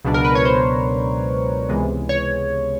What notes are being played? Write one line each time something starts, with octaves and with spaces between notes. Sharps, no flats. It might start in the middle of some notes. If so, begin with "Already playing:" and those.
C#2 B2 F#3 B3 D4
A#4
B4
C#5
C5
C#2 C3 E3 G#3 B3
C#5